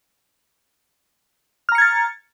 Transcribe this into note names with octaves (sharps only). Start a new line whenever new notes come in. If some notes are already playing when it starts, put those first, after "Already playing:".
A#5 F6 G#6 A6 C#7